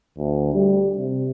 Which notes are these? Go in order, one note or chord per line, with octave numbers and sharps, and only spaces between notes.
D2
G3
C3